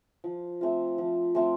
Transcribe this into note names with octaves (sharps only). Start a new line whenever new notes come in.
F3
A3 C4 F4
F3
A3 C4 F4